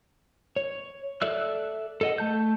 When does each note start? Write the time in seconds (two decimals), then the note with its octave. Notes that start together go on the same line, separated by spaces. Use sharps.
0.56 C#5
1.22 A4 D5 E5 E6 F#6
2.01 A4 D#5 F#5
2.18 A3 A5 G6